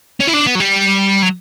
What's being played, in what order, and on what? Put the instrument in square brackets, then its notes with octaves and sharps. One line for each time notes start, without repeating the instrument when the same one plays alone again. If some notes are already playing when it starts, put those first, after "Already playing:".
[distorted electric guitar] C#4
E4
D4
B3
F#3
G3
F#3